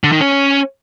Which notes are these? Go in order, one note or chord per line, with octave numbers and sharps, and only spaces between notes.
D3
D#3
C#4